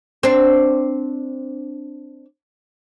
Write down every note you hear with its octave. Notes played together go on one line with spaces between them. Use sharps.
C4 D4